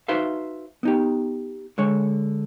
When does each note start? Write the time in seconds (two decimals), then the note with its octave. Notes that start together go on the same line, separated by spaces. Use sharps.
0.08 D#4 F#4 B4 C5 E5 F5
0.83 B3 D#4 G4
1.78 D3 G#3 C#5